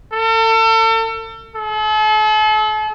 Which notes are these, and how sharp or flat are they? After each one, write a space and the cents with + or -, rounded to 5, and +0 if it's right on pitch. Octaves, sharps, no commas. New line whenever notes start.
A4 +35
A4 -40